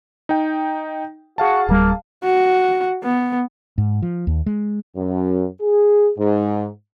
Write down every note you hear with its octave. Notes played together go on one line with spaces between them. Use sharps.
D#4 G5
F#4 G#4 F5 A5
D1 G3 A#3
F#4
B3
G#2
F3
D#2
G#3
F#2
G#4
G#2